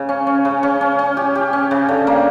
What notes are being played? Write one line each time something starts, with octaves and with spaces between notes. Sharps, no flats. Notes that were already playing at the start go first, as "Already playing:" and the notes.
Already playing: C#3
C#4
C#4
C#3
C#4
C#4
C#4
G4
G4
C#4
C#3
D3
A#3